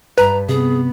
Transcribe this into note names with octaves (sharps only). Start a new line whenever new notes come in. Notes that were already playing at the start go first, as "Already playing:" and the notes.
G2 B4 A#5
C3 B3 G#4